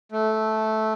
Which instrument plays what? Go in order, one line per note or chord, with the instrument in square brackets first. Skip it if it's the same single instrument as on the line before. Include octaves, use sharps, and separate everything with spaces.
[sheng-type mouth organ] A3